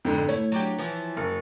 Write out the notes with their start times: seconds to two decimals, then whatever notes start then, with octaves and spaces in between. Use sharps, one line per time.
0.05 F2 G#2 D3
0.29 A3 E4 C#5
0.52 F#3 D4 G4
0.78 E3 F3
1.17 F#1 C#6